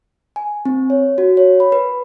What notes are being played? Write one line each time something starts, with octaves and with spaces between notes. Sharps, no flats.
G#5
C4
C#5
F#4
C#5
B5
B4